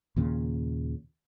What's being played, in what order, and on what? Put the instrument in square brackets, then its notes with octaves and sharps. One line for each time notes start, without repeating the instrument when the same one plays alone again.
[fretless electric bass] D#2 A#2 C#3